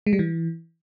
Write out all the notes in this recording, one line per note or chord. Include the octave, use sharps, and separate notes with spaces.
G#3
G3
E3